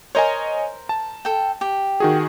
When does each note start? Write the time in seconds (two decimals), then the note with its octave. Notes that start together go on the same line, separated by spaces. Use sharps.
0.15 A#4 C5 C#5 D#5 G#5
0.89 A5
1.25 A4 G5
1.61 G4
2.00 D#3 F#4 G#4